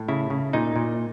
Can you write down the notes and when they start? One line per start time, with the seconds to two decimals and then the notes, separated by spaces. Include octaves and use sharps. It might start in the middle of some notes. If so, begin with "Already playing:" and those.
Already playing: A2
0.09 C#3 E4
0.30 C#3
0.53 A#2 D#4
0.76 A#2